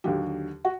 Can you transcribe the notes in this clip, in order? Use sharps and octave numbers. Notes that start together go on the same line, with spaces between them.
D#2 D3 F#3 G4
F#4